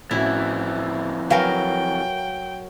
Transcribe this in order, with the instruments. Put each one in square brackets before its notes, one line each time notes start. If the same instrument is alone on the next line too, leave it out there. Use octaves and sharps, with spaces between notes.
[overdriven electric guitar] F2 E3 [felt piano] A2 C#4 F#4 [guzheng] E4
[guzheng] F#3 A#4 [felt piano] B4 F5 G#5 [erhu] G5